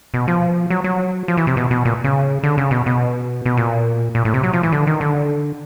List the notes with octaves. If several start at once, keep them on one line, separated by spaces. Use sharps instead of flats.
B2
F3
F#3
F#3
F3
E3
C3
B2
B2
A#2
C#3
D3
C#3
B2
B2
B2
A#2
A#2
A2
C3
F#3
F3
E3
D3
D#3
D3